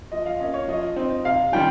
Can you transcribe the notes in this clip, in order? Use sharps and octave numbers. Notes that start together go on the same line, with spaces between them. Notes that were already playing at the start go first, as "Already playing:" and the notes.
F3 D#5
F5
A#3 C#4 D#5
C#5
F3 D#5
C4 D#4
C3 F5
D#3 G3 C#4 F4 G5